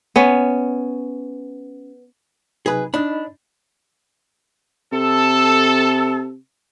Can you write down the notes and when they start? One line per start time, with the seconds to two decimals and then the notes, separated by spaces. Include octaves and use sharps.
0.16 B3 C#4
2.66 C3 F#3 D#4 G#4 B4
2.94 D4 D#4 D#5 B5
4.92 C3 A4